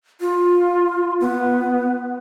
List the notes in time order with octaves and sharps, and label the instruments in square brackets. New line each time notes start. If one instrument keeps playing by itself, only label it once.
[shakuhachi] F4
B3